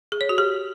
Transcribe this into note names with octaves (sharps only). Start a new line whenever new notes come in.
G#4
C#5
F#4
G4